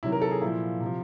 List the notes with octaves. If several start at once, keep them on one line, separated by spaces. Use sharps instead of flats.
C3 D#3 F#3 E4
A#4
A4
G#4
A#2 F3 E4
C3
F3